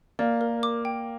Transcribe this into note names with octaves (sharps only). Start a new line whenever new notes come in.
A#3 D5
A#4
D6
G5